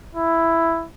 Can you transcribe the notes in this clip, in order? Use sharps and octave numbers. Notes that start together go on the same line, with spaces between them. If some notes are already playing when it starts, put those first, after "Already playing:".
E4